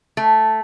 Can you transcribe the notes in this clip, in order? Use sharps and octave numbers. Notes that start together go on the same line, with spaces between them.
A3